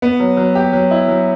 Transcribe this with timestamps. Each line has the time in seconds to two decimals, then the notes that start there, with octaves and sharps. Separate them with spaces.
0.02 B3
0.20 F#3
0.37 F#3
0.55 G4
0.73 F#3
0.91 E4
1.08 F#3